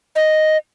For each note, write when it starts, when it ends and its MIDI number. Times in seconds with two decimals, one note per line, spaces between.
0.16 0.57 75